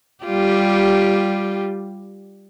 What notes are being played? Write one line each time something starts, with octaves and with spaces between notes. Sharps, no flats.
G3 F4 G4